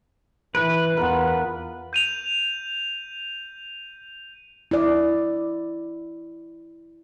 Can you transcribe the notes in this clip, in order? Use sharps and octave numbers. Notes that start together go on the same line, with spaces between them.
E3 B4
E2 B3 F4 A#4
G6 D#7 F7
E4 D5